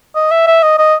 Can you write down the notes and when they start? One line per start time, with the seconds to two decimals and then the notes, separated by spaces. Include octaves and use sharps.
0.15 D#5
0.31 E5
0.47 E5
0.63 D#5
0.78 D#5